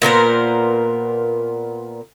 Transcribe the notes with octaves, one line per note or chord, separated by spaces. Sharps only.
A#2 B3 A#4 C5